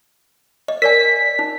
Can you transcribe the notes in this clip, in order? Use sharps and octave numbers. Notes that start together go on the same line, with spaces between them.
D#5
A#4 D5 G#5 B6
D#4